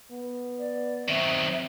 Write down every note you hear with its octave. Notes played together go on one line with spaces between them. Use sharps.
B3
D5
D#3 F#3 C4 E5